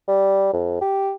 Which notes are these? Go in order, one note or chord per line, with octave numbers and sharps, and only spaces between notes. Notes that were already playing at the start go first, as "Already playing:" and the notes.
G3
F2
G4